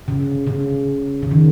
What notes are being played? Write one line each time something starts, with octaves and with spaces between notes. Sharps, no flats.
C#3
C#3
C#3
D#3